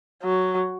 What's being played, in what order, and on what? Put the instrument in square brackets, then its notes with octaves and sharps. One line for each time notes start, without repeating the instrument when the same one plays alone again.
[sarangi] F#3